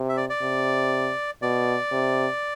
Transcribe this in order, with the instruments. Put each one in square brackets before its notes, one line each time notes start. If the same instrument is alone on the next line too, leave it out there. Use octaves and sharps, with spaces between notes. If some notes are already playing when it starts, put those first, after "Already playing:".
Already playing: [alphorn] C3
[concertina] E5
D5
D5
[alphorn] C3
[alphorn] B2 [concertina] D5
[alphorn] C3